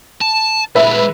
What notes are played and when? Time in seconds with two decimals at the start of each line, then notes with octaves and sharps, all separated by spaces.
0.21 A5
0.75 A#2 G#3 B4 E5